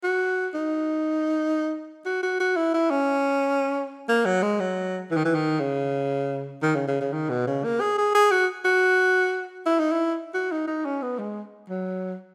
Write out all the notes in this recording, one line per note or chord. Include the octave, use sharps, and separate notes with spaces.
F#4
D#4
F#4
F#4
F#4
E4
E4
C#4
A#3
F#3
G#3
F#3
E3
D#3
E3
D#3
C#3
D#3
C#3
C#3
C#3
D#3
B2
C#3
A#3
G#4
G#4
G#4
F#4
F#4
E4
D#4
E4
F#4
D#4
D#4
C#4
B3
G#3
F#3